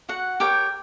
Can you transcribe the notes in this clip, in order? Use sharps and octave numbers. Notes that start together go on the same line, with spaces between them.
F#4 F#5
G4 A#4 C#5 G5